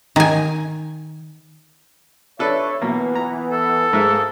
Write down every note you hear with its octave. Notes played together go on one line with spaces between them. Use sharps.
D#3 G#5
D4 A4 B4 C#5 E5
B2 E3 A#3 B3
A#5
A4
G#2 A#3 G#4 A#4 E5